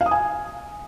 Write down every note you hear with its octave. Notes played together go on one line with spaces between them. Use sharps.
F5
D#6
G#5